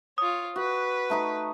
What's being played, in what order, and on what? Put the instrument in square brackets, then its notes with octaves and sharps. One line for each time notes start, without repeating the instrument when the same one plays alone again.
[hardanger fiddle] F4 C#5 [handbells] D#6
[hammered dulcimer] F#4 [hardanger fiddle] B4
[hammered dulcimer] A3 D#4 C#6